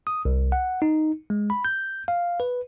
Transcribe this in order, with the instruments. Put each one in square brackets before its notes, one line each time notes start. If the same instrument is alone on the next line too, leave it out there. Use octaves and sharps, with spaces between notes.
[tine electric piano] D#6
C2
F#5
D#4
G#3
B5
G6
F5
B4